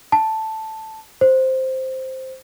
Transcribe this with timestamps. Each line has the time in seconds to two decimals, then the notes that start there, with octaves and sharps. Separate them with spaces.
0.12 A5
1.21 C5